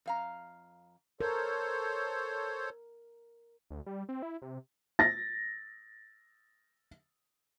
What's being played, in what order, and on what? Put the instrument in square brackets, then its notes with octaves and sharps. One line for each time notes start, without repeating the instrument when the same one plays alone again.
[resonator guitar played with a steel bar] F2 F5 A#5
[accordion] A4 C5 C#5 [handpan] A#4
[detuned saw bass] D2
G3
C4
E4
C3
[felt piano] A6 A#6